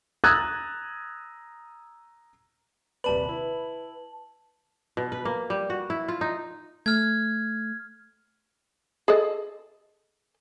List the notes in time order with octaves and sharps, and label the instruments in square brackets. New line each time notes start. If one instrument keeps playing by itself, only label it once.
[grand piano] A#5 D#6 E6 F#6 G#6 A6
[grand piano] D#1 C3 D5 [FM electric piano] B4 [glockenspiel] A5 F#7
[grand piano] E4
[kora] B2
B4
A#3
G3
F#4
E4
F4
D#4
[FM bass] A3 [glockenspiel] F6 G#6
[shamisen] G#4 A4 D#5